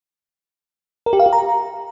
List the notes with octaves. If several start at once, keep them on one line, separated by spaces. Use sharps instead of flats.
A#4
G4
F5
G4
A#5